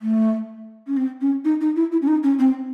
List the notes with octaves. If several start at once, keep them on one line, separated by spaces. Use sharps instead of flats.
A3
C#4
C4
C#4
D#4
D#4
E4
E4
C#4
D#4
C#4
C4